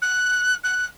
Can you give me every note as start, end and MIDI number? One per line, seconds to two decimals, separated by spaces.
0.02 0.55 90
0.64 0.85 90